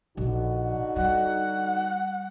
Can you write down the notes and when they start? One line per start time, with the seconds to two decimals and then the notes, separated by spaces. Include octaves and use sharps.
0.17 A#1 D3 D#4 F#4
0.96 G3 F#5